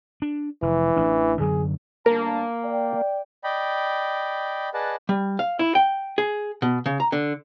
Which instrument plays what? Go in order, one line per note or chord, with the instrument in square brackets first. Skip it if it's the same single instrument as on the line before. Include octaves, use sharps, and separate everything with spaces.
[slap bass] D4
[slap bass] F1 [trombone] E3
[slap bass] A1 D4
[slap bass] F#2 D3 F#3 [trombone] G#4
[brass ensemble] G1 D4 A5 [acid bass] A#3 [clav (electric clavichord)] A#4
[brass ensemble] D5 G5
[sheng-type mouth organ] D5 D#5 G5 B5
G#4 B4 D5 D#5 F#5 A5
[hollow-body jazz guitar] G3
F5
E4
G5
G#4
B2
C#3
A#5
D3